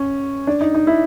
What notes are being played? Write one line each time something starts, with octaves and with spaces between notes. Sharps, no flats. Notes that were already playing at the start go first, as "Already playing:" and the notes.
Already playing: C#4
D4
D#4
D#4
E4